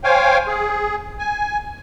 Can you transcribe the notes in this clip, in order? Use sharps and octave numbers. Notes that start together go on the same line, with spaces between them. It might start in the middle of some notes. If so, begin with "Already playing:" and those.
C5 C#5 F5 G5 G#5
G#4
G#5